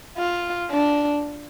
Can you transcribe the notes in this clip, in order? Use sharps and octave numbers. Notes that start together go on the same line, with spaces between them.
F4
D4